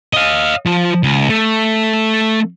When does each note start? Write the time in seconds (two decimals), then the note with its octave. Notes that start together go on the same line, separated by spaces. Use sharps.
0.13 D#5 F5
0.66 F3
1.03 C#2
1.29 A3